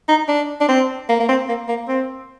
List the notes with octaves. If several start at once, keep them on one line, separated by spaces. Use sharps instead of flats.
D#4
D4
D4
C4
A#3
A#3
C4
A#3
A#3
C4